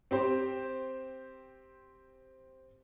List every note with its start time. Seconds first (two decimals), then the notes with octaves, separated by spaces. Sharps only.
0.11 C4 G4 C5